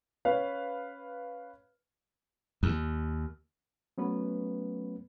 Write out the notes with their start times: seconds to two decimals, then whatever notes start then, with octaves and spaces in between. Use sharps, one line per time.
0.25 C#4 B4 F5
2.63 D#2
3.98 F#3 A3 B3 C#4 B4